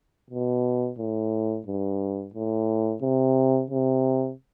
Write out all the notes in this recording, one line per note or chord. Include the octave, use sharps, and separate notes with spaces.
B2
A2
G2
A2
C3
C3